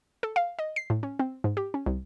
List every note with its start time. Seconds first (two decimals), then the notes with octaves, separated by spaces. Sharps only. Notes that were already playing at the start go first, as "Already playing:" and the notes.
0.23 A4
0.36 F5
0.59 D#5
0.76 C7
0.90 A2
1.03 C#4
1.19 C4
1.44 G#2
1.57 G4
1.74 C#4
1.86 C2